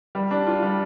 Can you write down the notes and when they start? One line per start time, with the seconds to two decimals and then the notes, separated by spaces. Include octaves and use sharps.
0.15 G3
0.31 D4
0.47 F4
0.62 G3